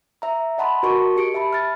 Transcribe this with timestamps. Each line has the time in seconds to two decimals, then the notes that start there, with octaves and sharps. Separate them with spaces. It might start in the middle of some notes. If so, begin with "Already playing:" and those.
0.22 E5 A#5
0.58 D#5 F#5 A5 B5 C6
0.83 F#4 A#4 D#5 A5 C#6
1.17 G4 C#7 D7
1.34 E5 A5 B5
1.53 F6 A6